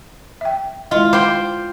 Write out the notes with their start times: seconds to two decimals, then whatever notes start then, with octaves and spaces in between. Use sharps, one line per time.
0.41 E5 G5
0.91 G#3 E4 F4 D#5
1.13 C5 G5 B5 C6 D6